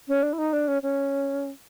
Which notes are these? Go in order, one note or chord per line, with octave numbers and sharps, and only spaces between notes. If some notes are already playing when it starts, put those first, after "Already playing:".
C#4
D4
E4
D#4
D4
C#4
C#4